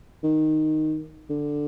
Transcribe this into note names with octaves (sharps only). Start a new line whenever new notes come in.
D#3
D3